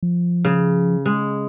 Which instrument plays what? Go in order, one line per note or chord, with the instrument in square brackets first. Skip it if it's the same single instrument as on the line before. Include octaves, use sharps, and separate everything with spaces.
[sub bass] F3
[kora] C#3
G#3